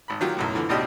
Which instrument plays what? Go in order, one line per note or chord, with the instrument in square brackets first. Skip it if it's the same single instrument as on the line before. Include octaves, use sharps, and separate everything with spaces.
[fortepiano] G#1 B5
D#3 F#3 F4 G4
B1 F#2 A2
D3 E3 F3
G#1 C#2 B2 D4 G4 D#5